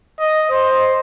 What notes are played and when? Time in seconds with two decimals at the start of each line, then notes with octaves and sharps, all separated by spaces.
0.20 D#5
0.49 C5 D#5